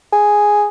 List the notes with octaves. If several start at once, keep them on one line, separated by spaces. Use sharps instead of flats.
G#4